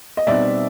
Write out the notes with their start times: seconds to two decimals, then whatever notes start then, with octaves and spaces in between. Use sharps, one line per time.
0.17 D#5
0.27 B2 G3 C4 D#4 D5 E5